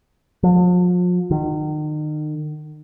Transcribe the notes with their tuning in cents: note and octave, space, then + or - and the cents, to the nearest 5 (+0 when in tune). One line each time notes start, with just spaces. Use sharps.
F3 +40
D#3 -35